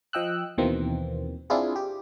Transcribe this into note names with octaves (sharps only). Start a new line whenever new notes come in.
F3 D#5 G5 E6 F#6
D#2 B2 D#3 E3 A#3 C4
C4 D4 E4 F4 G#4
G4